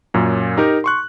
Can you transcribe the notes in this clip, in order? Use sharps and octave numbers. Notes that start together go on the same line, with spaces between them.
F#2 A#2 C#4
D#4 G4 A#4
C6 C#6 F#6